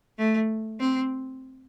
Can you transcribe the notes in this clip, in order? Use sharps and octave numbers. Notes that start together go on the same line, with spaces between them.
A3
C4